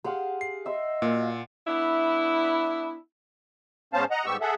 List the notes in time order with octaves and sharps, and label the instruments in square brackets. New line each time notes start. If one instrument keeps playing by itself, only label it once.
[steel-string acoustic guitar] G4 G#4 [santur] F5 F#5 C6
[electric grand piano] C7
[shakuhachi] D#5 [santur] E5 C6
[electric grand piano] A#2 [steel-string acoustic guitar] A#3 F4 F#4
[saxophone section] B3 D4 E4
[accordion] G#2 B3 C#4 C5 F5 A5
D#5 F#5 A#5
G#2 G3 B3 G4 C#6 E6
G#4 A4 E5 F#5